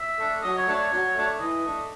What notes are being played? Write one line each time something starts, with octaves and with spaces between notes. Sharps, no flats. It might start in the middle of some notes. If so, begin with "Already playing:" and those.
Already playing: E5
A3 D4
F#3 D#5
C#5
A3 D4
C#5
F#3
A3 D4
E3 D#5
A3 D4